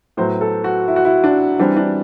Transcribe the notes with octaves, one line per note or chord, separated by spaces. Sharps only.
A2 F#3 B3 C5
A4
F#4
E4
F#4
E4
D4
E3 G3 C4 D4
D4